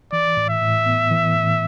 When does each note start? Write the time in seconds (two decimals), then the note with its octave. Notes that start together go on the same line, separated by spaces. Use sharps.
0.12 E3 D5
0.37 A2
0.49 E5
0.61 A2
0.86 B3
1.11 E3
1.36 A2